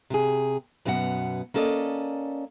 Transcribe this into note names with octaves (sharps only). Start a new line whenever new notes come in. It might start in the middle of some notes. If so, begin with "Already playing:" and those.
C3 G#4
F#2 B2 B3 F#4 F#5
A#3 C#4 A4 D5 D#5